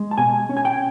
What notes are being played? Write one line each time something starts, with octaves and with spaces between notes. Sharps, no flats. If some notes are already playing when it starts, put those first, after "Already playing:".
Already playing: G#3
A5
B2 G#5
C#4
G#5
G5